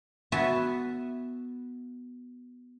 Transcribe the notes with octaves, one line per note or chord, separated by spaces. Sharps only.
B3 F#4 B4 E5 G#5 A5